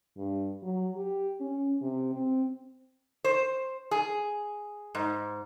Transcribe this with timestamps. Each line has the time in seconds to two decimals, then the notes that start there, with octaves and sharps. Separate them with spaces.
0.17 G2
0.63 F#3
0.96 G4
1.40 C#4
1.82 C3
2.14 C4
3.24 C5
3.91 G#4
4.95 G#2